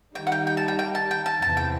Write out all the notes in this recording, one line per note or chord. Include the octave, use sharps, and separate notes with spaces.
D#3 G3 D#4 G5
F#5
G5
G5
A5
G5
G5
A5
G5
A5
E2 C3 E3 A5
G5